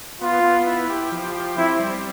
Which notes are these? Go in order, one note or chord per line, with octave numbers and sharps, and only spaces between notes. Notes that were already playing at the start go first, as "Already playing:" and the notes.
B3 F4
B3
E4
G4
F3
G4
C4 E4
G3